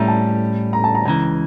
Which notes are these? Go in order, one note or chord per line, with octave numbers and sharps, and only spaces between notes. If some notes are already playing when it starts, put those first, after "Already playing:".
Already playing: A2 G3 C#4 E5 A#5
A5
A#5
A5
A#5
C#2 C#3 E3 A#5